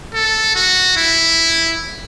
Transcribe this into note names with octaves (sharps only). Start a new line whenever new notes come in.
A4
F#4
E4